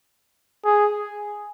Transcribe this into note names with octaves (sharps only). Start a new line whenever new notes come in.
G#4